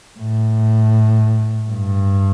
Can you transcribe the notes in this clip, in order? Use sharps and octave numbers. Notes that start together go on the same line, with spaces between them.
A2
G2